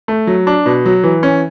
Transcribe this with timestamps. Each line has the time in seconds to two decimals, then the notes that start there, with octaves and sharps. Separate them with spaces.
0.08 A3
0.27 F#3
0.47 D4
0.66 B2
0.86 F#3
1.03 E3
1.23 C#4